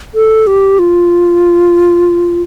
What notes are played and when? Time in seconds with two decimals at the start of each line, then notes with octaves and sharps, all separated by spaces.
0.15 A4
0.47 G4
0.79 F4